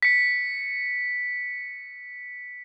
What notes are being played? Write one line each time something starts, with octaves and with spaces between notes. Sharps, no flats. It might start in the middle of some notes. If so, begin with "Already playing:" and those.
B6 C#7